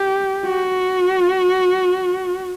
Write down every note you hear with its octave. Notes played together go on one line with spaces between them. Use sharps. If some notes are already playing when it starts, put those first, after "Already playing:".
Already playing: G4
F#4